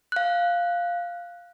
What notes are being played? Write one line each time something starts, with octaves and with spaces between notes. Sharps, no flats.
F5 F#6